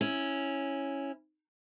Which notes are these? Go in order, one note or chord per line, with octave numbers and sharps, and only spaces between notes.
C#4 E4